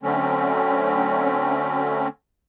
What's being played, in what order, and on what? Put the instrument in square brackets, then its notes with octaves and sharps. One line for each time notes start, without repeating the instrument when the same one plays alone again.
[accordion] D3 F#3 A3 C4 C#4